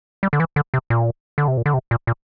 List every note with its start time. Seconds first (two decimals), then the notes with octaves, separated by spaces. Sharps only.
0.23 G3
0.33 D3
0.40 E3
0.56 D3
0.74 C3
0.90 A#2
1.38 D3
1.48 C3
1.57 A#2
1.66 D3
1.74 C3
1.91 A#2
2.07 A#2